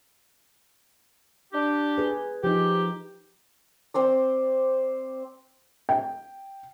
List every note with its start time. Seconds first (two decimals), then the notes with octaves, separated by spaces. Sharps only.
1.53 D4 G4
1.98 G#4 B4
2.44 F3 D#4 G4
3.94 C4 C5 D5
5.89 G5